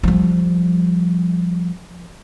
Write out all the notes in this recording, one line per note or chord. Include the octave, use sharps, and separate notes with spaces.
F3 G3